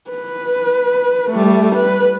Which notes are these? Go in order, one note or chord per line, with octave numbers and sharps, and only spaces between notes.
B4
G3 A3
B4